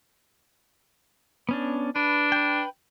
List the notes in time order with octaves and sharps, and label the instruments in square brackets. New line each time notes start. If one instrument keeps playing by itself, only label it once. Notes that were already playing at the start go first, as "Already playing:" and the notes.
[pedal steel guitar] B3 C#4 D4
[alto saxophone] D4 [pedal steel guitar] B4
[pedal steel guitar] B4 G5